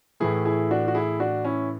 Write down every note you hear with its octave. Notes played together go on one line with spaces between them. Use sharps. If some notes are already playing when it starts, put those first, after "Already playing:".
A2 E3 A3 E4 G#4
E4 G#4
D4 F#4
F#4
E4 G#4
D4 F#4
C#4 E4